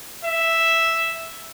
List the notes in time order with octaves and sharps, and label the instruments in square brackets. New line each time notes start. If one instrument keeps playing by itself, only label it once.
[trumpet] E5